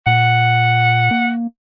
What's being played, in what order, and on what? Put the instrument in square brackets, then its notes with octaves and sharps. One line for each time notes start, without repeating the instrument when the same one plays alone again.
[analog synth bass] A#2 [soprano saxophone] F#5
[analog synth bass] A#3